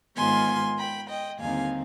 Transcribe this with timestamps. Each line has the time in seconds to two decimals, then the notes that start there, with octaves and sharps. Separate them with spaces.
0.17 G#2 D#3 B3 F4 G#5 C6
0.78 G5 B5
1.09 D#5 G5
1.39 D#2 D3 G3 C4 D#4 F5 G#5